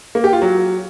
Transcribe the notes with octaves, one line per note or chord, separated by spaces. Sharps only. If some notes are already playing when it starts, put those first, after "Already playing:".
A#3
G4
F4
F#3